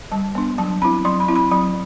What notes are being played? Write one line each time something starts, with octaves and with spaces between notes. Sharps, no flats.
G3 A5
B3 D4
F#3 A5
C4 E4 B5
F#3 C6
B5
C4 E4
B5
F#3 B5